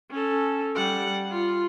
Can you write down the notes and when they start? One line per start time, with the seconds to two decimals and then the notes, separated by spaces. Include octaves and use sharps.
0.11 C#4 A4
0.76 G3 F#5
1.31 F4